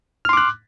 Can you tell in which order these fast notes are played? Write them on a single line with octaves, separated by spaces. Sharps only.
F6 C6 D6 F#6